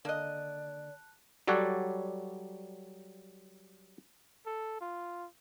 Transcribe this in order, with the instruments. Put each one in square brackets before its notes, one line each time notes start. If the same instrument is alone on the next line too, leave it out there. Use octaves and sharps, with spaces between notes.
[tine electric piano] D3 [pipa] A#3 D#5 [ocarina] D5 [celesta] A5 F#6
[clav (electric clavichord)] F#3 G3 A4 C#5 D5 F#5
[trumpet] A4
F4